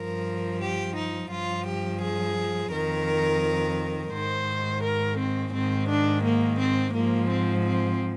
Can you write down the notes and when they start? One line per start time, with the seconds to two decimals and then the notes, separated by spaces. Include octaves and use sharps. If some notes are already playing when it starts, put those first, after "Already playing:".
Already playing: G2 F3 A#4
0.60 G4
0.96 D#4
1.30 G2 F3 F4
1.66 G4
2.01 G#4
2.71 F2 D#3 A#4
4.13 G#2 D#3 C5
4.83 A#4
5.18 C4
5.53 G#2 D#3 C4
5.89 D4
6.24 A#3
6.59 C4
6.94 G#2 F3 A#3
7.29 C4
7.65 C4